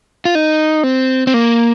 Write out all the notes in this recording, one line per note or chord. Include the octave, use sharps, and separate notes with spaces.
F4
D#4
C4
C4
A#3